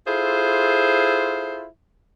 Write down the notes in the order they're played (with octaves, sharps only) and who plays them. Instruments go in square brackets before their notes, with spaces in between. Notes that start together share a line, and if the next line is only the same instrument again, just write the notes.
[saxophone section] E4 F4 G#4 A4 C5